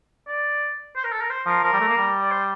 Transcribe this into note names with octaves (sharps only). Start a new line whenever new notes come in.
D5
C5
A#4
A4
A#4
C5
F3 A#4
F3 A#4
G3
A3
A#3
G3
D5
C5